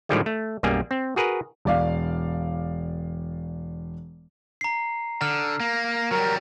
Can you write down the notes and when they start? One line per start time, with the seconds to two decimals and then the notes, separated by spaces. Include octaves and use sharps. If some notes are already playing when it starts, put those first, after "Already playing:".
0.09 A2 D3 D#3 F3 G3 G#3
0.26 A3
0.63 B1 F#2 G3 A#3 G#4 G#5
0.91 C4
1.16 F#4 G#4 A#4 B4
1.65 E1 D5 F5
4.61 A#5 C7
5.22 D3 F6
5.60 A#3
6.11 F#3 G3 A#4